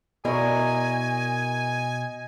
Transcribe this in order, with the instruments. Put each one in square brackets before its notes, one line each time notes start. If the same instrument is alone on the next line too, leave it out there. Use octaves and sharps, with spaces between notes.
[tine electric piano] B2 [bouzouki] E4 A#4 D5 [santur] D#5 C#6 [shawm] G#5